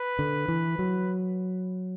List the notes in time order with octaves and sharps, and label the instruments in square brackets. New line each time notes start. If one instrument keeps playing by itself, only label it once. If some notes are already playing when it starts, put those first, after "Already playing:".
Already playing: [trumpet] B4
[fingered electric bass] D3
E3
F#3